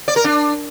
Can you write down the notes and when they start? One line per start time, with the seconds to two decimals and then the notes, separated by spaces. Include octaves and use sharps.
0.08 D5
0.16 A#4
0.24 D4